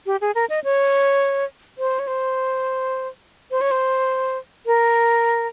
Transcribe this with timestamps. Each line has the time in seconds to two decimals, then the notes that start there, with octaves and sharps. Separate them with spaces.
0.06 G4
0.21 G#4
0.35 A#4
0.50 D#5
0.64 C#5
1.78 C5
1.99 C#5
2.07 C5
3.51 C5
3.61 C#5
3.71 C5
4.66 A#4